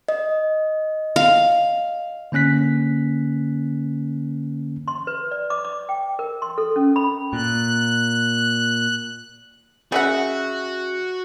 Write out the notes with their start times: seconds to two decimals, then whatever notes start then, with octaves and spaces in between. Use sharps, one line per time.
0.09 D#5
1.16 F5
2.32 D3 A#3 C#4 F#6 B6
4.88 C6
5.07 B4
5.31 D5
5.50 D6
5.65 D6
5.89 G5
6.19 A#4
6.42 C6
6.58 A4
6.76 C#4
6.96 B5
7.33 A#2 F#6
9.92 C#3 F#4 E5 F#5